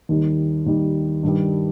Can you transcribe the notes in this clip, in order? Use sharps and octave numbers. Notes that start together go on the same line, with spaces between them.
D#2 D#3 G3
D#2 D#3 G3
G2 D#3 G3